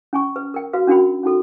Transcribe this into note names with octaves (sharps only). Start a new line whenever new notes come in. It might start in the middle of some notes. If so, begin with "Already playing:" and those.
C#4 G#5 C#6
B4
A#4 G5
F#4 B4 F5
C#4 D4 F#4 A#4 G5 B5
C#4 D#4 F#4 A4